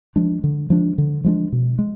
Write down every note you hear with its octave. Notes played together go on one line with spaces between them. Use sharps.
F3 G#3 D4
D3
F3 G#3 D4
D3
F3 G#3 D4
B2
G#3